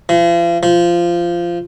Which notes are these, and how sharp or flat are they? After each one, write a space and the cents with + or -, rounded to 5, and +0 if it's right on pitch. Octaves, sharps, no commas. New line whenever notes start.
F3 -40
F3 -15